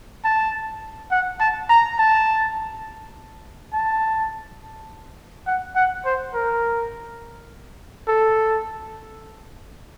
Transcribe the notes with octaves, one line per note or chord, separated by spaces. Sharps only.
A5
F#5
A5
A#5
A5
A5
F#5
F#5
C5
A#4
A4